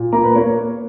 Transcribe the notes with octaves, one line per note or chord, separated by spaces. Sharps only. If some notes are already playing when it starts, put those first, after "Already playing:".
Already playing: A#2
A#3 A#5
B4
A#3 C#5